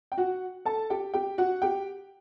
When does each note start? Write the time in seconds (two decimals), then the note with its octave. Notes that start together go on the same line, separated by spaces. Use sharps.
0.12 G5
0.17 F#4 F#5
0.65 A4 A5
0.90 G4 G5
1.14 G4 G5
1.38 F#4 F#5
1.62 G4 G5